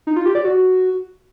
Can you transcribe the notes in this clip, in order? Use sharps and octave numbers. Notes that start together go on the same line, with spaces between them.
D#4
F4
G4
D5
F#4